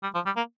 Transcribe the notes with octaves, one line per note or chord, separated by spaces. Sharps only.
G3
F3
G3
A#3